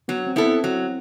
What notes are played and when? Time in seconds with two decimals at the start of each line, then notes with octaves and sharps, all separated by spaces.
0.08 F#3 B3
0.27 C4
0.36 B3 E4 A4
0.45 C4
0.64 F#3